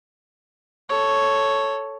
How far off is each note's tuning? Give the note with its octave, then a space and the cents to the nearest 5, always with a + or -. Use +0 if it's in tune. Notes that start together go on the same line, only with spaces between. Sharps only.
A4 +0 C#5 +0